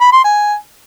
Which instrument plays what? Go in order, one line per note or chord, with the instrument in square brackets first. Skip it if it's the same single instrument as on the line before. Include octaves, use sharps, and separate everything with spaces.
[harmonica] B5
C6
G#5